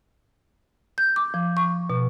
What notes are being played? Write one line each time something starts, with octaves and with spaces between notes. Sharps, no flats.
G6
D6
F3
C#6
B2